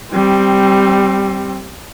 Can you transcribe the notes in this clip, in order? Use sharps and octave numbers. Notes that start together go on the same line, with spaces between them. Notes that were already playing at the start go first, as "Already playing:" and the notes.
G3 C4